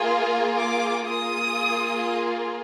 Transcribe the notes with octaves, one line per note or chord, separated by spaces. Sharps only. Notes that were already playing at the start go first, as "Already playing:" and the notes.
Already playing: A#3 F4 G#4
D6
A#3 F4 G#4 D#6